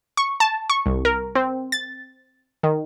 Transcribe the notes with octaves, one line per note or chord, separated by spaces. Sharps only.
C#6
A5
C#6
C2
A#4
C4
A6
D#3